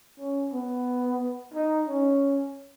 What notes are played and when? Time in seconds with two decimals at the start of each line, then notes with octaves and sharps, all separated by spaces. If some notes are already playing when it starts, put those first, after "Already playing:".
0.19 C#4
0.53 B3
1.54 D#4
1.88 C#4